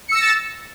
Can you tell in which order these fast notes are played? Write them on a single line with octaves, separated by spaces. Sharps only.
C#7 E6 A#6 E7 A6